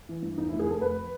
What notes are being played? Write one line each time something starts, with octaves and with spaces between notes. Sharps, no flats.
E3
G2
E2 D#4
F1 E4
G#4
F1 A4
F1 B4